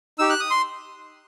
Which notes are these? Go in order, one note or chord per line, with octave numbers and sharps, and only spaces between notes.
D#4 G4 E6
F#6
D#6
C6